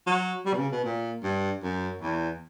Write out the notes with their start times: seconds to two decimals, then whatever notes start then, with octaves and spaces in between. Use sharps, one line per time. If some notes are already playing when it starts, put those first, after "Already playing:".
0.06 F#3
0.46 G3
0.53 B2
0.58 C#3
0.72 B2
0.85 A#2
1.23 G2
1.63 F#2
2.01 E2